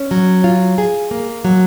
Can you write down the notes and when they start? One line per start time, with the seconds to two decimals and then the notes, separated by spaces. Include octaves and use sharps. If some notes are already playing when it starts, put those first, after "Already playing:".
Already playing: C#4
0.11 F#3
0.44 F4
0.78 G#4
1.11 A#3
1.44 F#3